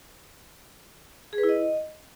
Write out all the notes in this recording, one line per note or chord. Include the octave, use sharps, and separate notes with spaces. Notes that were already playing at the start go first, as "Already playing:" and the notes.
G#4
B4
E4
D#5